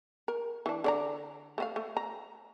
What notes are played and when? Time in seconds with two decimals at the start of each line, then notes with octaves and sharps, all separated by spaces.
0.28 A#4
0.66 E3 D4
0.84 D3 D5 A#5
1.58 A3 C4 F5
1.76 A3
1.97 A#5